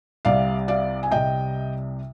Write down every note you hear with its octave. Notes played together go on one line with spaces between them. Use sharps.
C2 C3 G3 D5 F5
D5 F5
G#5
C2 C3 G3 D#5 G5